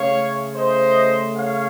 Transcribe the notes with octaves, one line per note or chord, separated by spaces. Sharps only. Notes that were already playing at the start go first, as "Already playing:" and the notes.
Already playing: C#3 A3 C#5 F5
C5 D#5
C#5 F5